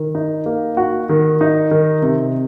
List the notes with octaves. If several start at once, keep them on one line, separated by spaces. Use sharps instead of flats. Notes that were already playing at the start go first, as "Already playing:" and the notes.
Already playing: D#3
D#4
A#3
F#4
D#3
D#4
D#3
C3